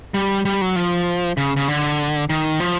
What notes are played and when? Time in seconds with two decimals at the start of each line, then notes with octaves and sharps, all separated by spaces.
0.14 G3
0.45 G3
0.61 F#3
0.76 F3
1.37 C#3
1.57 C#3
1.68 D3
2.30 D#3
2.60 F3